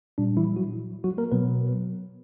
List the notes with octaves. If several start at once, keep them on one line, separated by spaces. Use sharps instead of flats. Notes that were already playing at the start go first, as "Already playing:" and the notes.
A#2 G3 D4
E3 E4
F#3 F#4
F#3 F#4
A#3 A#4
B2 F#3 B3 B4